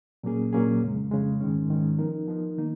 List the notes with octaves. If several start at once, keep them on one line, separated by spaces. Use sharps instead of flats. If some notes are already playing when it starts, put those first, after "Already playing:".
A#2 F#3 A#3 C#4 G#4
A#2 F#3 A#3 C#4 G#4
F2 C#3 G#3
F2 C#3 G#3
G#2 D#3 G#3 C#4
G#2 D#3 G#3 C#4
F3 B3 D#4 A#4
F3 B3 D#4 A#4
D#3 A#3 D#4